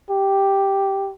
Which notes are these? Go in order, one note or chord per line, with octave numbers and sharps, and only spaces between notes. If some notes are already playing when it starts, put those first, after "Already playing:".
G4